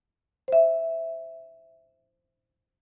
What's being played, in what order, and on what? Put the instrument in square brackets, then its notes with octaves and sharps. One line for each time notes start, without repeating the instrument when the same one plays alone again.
[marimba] C5 E5